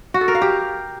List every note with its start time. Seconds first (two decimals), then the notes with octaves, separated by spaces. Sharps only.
0.14 F#4
0.21 A4
0.28 A#4
0.35 F5
0.41 G4